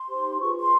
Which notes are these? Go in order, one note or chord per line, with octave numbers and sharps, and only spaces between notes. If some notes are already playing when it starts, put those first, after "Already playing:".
Already playing: C6
D#4 G4 C5
F4 G#4 B4 C#6
C6